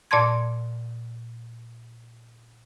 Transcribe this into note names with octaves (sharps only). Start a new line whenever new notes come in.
A#2 D5 A5 C6 G#6